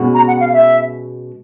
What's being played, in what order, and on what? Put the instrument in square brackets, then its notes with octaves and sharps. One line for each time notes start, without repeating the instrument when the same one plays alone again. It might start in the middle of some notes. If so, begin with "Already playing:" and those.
Already playing: [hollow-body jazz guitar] B2 G#3 C#4 F#4
[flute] A#5
F#5
F5
E5